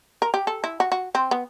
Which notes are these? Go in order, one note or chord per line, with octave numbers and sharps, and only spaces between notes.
A#4
G4
A4
E4
F#4
F#4
C4
B3